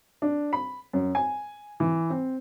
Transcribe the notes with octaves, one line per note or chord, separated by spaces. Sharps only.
D4
B5
F#2
G#5
E3
C4